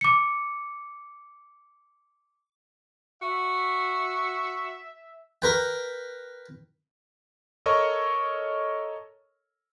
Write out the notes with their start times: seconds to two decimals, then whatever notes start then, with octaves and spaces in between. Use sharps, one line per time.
0.01 D6 C#7
3.22 F#4 E5
5.42 A#4 B4 G5
7.66 A4 A#4 C#5 D#5 C#6